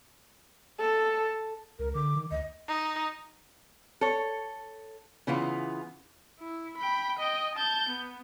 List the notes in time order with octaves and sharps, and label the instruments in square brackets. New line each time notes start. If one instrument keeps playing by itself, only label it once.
[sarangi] A4
[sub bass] C#2 [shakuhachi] A#4
[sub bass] D3 [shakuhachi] D6
[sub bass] D#3
[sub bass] D2 [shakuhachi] D#5
[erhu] D#4
[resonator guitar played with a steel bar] A4 C#5
C#3 E3 B3 F4
[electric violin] E4
G5 B5
D#5 G5
A5 G6
B3